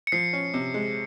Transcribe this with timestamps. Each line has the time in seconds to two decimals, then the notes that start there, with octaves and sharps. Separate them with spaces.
0.07 C#7
0.12 F3 C7
0.33 C#4
0.54 C3
0.74 G#3